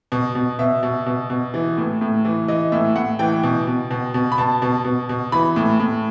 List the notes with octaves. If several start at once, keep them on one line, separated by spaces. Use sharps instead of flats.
B2
B2
B2 E5
B2
B2
B2
E3
A2
A2
E3
E3 D#5
A2 E5
A2 F#5
E3 G5
B2
B2
B2
B2
B5
B2 A5
B2
B2
B2
E3 B5
A2
A2